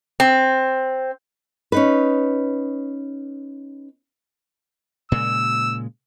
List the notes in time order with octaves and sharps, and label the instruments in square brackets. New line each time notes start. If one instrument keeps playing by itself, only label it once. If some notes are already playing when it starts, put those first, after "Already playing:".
[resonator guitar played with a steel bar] C4
[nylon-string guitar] C#4 D#4 B4
[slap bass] A#2 C#3 G#3 [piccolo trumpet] E6